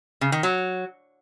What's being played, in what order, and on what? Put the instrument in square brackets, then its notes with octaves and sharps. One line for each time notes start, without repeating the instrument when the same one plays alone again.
[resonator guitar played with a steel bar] C#3
D#3
F#3